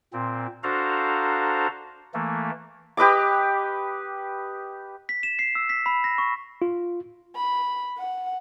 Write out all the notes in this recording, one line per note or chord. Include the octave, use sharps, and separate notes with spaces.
A#2 C4
D4 F#4 A4 C5 F5 A#5
E3 A3 A#3
G4 B4 D#5 D6
B6
E7
C7
E6
B6
B5
A#6
C#6
F4
B5
F#5